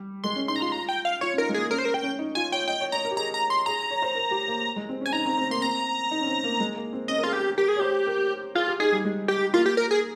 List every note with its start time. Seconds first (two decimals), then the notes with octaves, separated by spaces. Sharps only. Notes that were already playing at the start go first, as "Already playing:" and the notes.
Already playing: G3
0.24 G#3 C6
0.36 C#4
0.48 D#4 C6
0.56 A#5
0.61 F4 C6
0.72 A#5
0.89 G5
1.05 F5
1.21 F4 C#5
1.34 C#4
1.38 D#4 A#4
1.49 G#3
1.54 A#3 G#4
1.70 C#4 A#4
1.78 C5
1.85 A#4
1.94 G5
2.03 C#4
2.19 D#4
2.35 F4 G#5
2.52 C#5 G5
2.68 D#5 G5
2.80 C#5
2.92 C#5 A#5
3.05 A#4
3.11 G4
3.17 G#4 A#5
3.34 A#5
3.50 C6
3.66 G#4 A#5
3.91 C#5
4.02 C5
4.15 A#4
4.31 G4
4.48 A#3
4.76 G#3
4.89 C4
5.01 C#4 G#5
5.13 D#4 A#5
5.26 C4
5.37 C4
5.50 A#3 C6
5.62 C4 A#5
6.11 D#4
6.21 C#4
6.26 C4
6.44 A#3
6.60 G#3
6.76 A#3
6.93 C4
7.08 C#4 D#5
7.18 A#4
7.23 F4 G#4
7.33 G4
7.41 G#4
7.57 G4 A#4
7.68 G#4
7.76 C#5
7.80 G4 C5
8.07 A#4
8.55 F4 G#4
8.67 G4
8.79 D#4 G#4
8.92 G3
9.04 G#3
9.28 G4
9.53 A#3 F4
9.66 G4
9.77 A#4
9.91 G#4